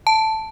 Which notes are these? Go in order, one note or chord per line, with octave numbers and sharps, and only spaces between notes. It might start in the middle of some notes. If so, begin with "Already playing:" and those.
A5